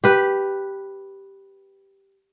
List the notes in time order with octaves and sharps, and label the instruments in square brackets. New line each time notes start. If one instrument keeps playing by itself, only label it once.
[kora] G4 B4